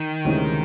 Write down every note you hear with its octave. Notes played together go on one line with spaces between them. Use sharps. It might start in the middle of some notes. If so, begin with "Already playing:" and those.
Already playing: D#3
D2 C3 E3 G#3 C#4